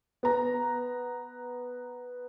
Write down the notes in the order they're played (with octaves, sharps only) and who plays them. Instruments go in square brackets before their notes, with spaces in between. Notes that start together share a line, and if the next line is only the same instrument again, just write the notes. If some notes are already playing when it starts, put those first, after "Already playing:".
[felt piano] B3 A#5